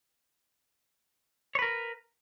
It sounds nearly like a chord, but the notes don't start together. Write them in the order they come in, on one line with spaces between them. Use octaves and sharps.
C#5 B4 A#4